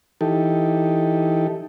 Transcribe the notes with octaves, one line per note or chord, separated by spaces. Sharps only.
E3 D#4 G4 A4